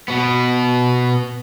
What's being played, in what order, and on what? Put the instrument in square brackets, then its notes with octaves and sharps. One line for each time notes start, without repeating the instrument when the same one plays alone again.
[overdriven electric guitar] B2 B3